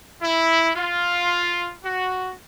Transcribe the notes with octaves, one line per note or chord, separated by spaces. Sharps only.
E4
F4
F#4